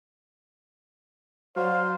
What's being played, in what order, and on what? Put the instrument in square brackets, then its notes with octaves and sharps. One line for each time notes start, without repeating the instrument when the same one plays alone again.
[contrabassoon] F#3 [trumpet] C5 [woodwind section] D5 F5